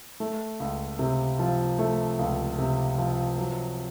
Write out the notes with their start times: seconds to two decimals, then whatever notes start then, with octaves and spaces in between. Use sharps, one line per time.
0.20 A3
0.60 C#2
0.99 C3
1.39 F3
1.79 A3
2.19 C#2
2.58 C3
2.98 F3
3.38 F#3